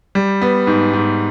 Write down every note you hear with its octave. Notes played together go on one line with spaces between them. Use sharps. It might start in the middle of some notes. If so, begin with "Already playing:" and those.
G3
B3
G#2
G#2